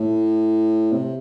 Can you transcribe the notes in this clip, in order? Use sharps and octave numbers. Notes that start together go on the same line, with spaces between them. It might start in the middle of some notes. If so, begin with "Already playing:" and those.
Already playing: A2
C3